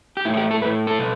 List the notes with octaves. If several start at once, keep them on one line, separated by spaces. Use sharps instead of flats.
G4
A2 A3 E4 A4
G4
A4
A2 A3 B4
A4
B2